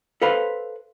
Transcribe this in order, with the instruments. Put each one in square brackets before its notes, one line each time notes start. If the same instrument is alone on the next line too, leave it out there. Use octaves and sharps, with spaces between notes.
[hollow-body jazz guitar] A4 B4 C5 F5 B5